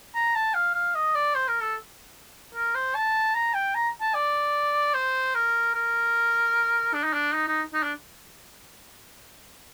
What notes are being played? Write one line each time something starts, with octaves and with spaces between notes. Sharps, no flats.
A#5
A5
F5
F5
D#5
D5
C5
A#4
A4
A#4
C5
A5
A#5
G5
A#5
A5
D5
C5
A#4
A#4
D4
D#4
D4
D#4
D#4
D#4
D4